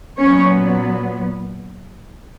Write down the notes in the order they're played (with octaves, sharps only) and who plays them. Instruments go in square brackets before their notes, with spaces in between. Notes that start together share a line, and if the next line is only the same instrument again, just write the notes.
[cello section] A#2 F#3 B3 C#4 C#5